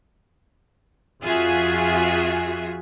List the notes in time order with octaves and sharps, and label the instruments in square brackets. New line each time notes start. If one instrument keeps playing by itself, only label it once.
[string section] F2 F4 F#4 G#4 E5